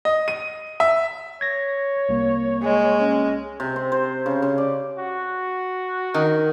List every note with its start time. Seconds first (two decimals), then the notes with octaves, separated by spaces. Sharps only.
0.05 D#5
0.28 D#7
0.80 E5
1.41 C#5 G#6 A#6
2.09 C2 A#3
2.63 G#3
3.00 C#4
3.60 C3
3.76 C4
3.92 C5
4.26 C#3
4.42 C#3
4.58 D5
4.98 F#4
6.14 D#3